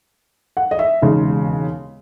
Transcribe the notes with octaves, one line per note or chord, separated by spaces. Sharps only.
F#5
D#5
E5
E1 D#2 C#3 G#3